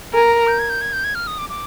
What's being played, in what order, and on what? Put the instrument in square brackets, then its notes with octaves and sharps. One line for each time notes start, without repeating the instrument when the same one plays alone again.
[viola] A#4 [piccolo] G#5
[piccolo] A#5
A#5
G6
G#6
G6
G#6
G6
G#6
F6
D#6
D6
D6